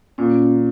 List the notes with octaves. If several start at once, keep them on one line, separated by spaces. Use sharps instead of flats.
A#2 C#4